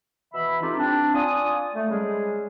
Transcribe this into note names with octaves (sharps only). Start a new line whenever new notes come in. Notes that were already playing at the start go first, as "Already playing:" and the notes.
B2 E3 E5 B5
A3 C4 D#4 F4 G4
C4 D4
F4 D5 G#5 D#6
A3
C#3 G3 G#3 G#4